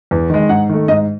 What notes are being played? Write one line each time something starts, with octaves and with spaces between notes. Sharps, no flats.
E2
D#3 G#3
G#2 F#5
D#3 A3
G#2 D#5